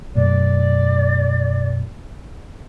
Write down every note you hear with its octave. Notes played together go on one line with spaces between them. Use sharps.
B1 F#2 A3 D5